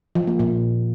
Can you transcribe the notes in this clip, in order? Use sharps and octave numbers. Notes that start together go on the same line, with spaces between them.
F3
A#3
A#2